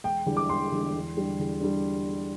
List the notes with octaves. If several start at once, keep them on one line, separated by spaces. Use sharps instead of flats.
E1 G5
E2 D3 G3
D6
E1 C6
E2 D3 G3
E2
D3 G3
E2
D3 G3